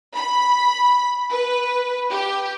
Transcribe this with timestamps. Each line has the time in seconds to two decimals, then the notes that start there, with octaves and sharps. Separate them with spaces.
0.14 B5
1.30 B4
2.09 G4